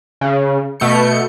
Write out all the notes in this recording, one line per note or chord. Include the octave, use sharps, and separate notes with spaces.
C#3
B2 A3 G6 C#7